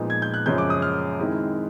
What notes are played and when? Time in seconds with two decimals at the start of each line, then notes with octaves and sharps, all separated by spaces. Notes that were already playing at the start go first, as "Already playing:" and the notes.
Already playing: A#2 F3 G#3 B3 D#4
0.10 G#6
0.22 G6
0.34 F#6
0.46 F#2 C#3 F3 G#3 C#4 G6
0.58 D6
0.70 D#6
0.82 F6
1.19 D#3 G#3 C4 E4